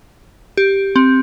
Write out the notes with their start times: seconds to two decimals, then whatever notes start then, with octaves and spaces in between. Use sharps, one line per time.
0.57 G4
0.96 C4